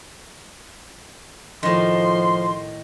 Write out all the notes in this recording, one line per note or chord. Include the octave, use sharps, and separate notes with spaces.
A2 D#3 F3 C6